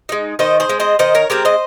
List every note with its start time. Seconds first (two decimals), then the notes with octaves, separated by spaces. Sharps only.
0.09 G#3 D#4
0.39 D#3 C5 D#5
0.60 G#4 C5
0.69 G#3 C4
0.80 C5 D#5
0.99 D#3 C5 D#5
1.15 A#4 C#5
1.30 G#3 C4 G4 A#4
1.45 C5 D#5